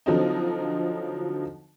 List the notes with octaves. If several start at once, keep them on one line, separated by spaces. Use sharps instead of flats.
D3 F3 F#3 C4 D#4